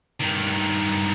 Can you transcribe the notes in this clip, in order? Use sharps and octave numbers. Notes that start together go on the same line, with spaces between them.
G2 D#3